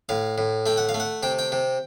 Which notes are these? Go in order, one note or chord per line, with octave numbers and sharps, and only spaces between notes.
A2 F5
A2
A3 G5
F#5
F5
A3
F#5
C3 G5
G5
C3